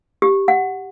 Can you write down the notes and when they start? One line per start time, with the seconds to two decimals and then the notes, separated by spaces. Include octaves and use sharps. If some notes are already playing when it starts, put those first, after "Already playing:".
0.22 G4
0.48 F#5